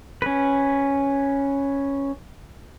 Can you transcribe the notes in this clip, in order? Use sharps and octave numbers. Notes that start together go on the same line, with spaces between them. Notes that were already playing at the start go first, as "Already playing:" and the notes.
C#4 B4